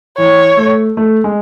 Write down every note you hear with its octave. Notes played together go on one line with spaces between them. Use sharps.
E3 C#5
A3
A3
G#3